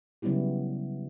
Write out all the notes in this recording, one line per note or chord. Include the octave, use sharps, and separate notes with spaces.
C#3 F#3 G3 B3 E4 G4